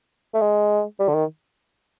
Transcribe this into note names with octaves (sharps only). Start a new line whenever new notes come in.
A3
G#3
G3
D3
D#3